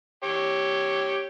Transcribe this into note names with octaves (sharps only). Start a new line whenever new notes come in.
G4 C#5